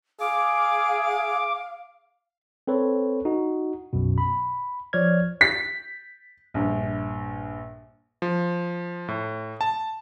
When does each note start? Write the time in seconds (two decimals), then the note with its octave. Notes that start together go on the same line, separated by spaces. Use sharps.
0.20 G#4 F5 D6
2.67 C4 A4 B4 C#5
3.25 D#4 F#4
3.93 B1 F#2 B2
4.18 B5
4.93 F3 C#5 D5 F6 G#6
5.41 B6
6.54 A#1 G2
8.22 F3
9.08 A2
9.61 A5